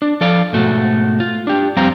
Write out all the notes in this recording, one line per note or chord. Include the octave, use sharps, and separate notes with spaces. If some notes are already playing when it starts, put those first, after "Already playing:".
D4
F3 A4 D5 F5
G#2 B2 A3 F#4
F4
D4 G4
F2 G3 C4 G4 F5 A#5